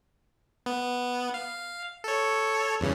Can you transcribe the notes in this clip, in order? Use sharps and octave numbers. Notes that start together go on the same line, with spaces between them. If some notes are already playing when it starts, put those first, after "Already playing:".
B3
F5
A4 C#5
E2 G2 C#3